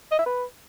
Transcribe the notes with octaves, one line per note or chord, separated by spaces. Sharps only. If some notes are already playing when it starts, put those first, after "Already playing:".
D#5
E5
B4